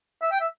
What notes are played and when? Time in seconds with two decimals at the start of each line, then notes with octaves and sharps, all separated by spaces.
0.22 E5
0.31 G5
0.41 E5